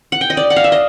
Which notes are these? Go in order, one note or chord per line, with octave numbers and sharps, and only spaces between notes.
F#5
G5
D#5
D5
F#5
F5
E5
D#5